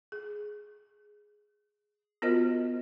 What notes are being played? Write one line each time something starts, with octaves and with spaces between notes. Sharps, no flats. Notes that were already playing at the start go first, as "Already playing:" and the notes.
G#4
B3 F4 F#4 A#4 C5 D#5